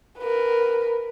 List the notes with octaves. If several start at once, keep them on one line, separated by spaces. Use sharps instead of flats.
A#4 B4